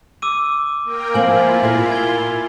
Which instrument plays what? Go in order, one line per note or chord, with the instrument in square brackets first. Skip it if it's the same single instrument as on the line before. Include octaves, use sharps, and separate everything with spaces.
[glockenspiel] D6 E6 D#7
[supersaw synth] A#3 A#4 G5
[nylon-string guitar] F3 A#3 C4 [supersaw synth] E4 F4 [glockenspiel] G#5 F#7
[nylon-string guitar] A#2 A#4
[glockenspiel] G#6 G7